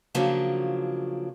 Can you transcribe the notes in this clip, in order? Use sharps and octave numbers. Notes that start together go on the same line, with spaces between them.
C#3 F3 F#3 A#3 D4